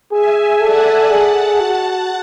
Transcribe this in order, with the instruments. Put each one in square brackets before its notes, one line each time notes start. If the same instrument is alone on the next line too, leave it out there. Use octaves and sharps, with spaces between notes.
[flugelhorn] G#4 [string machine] E5 G#5
[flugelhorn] A4 [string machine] D5 F#5
[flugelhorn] G#4 [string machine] F#5 A5
[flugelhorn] F#4